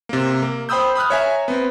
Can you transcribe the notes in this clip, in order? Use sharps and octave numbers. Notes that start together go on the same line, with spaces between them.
C3 A#3
A#3
C5 G5 B5 D#6 E6 G6
B5 D#6 F6 F#6
C#5 E5 G#5 A#5
B3 C4